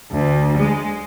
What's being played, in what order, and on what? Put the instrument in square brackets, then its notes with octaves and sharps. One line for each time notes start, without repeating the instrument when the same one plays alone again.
[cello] D2
G#3